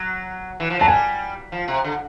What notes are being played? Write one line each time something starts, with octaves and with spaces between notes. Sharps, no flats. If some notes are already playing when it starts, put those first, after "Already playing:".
Already playing: F#3
E3
F3
F#3 A5
G3 G#5
F3
C3
D3